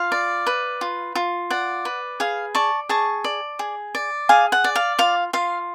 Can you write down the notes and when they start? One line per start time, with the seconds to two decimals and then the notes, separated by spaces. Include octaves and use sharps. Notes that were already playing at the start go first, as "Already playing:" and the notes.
Already playing: F4 F5
0.12 D5
0.47 B4
0.81 F4
1.15 F4
1.50 D5 F#5
1.85 B4
2.20 G#4 F5
2.55 D5 A5 C#6
2.89 G#4 A5 C#6
3.24 D5
3.59 G#4
3.95 D5
4.29 G#4 F5 G#5
4.52 F#5
4.64 D5
4.76 F5
4.99 F4 F5
5.33 F4 F5